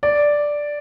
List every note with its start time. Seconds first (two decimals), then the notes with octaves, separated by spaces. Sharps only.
0.03 D5